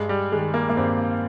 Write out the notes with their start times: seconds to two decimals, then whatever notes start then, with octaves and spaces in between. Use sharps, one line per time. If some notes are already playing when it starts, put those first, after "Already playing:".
Already playing: G2 G#3
0.09 G3
0.32 D#3 G#3
0.54 A#3
0.70 A#3
0.77 G2 C4